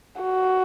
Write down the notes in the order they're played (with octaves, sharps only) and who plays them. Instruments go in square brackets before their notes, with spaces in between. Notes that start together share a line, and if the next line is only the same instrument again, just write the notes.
[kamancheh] F#4